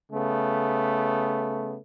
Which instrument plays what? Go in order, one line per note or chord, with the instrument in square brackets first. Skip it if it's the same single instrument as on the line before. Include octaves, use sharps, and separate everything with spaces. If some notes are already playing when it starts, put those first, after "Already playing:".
[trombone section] C#3 A3 B3